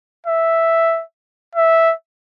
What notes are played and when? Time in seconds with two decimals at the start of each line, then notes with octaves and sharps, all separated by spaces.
0.27 E5
1.55 E5